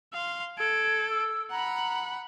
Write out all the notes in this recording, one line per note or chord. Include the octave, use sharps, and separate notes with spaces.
F5 C6
A4 G#6 D7
E6
F#5 A#5 B5